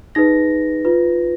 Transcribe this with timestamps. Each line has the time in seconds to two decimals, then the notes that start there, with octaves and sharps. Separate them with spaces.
0.15 D#4 G#4 B4 A#6
0.85 F4 B4